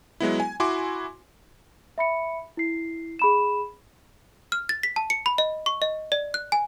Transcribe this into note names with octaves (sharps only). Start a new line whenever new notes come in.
F#3 G#3 B3 E4
G#5
E4 F#4 G#5 C6 D6
E5 B5 C#7
E4 C7
G#4 B5 E7
F6
A6
B6
A5
C#7
B5
D#5
C#6
D#5
D5
F#6
G#5